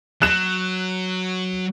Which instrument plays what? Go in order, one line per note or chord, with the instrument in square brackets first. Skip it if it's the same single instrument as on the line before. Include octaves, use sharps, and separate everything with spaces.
[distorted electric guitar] F#3 [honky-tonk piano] F#6 E7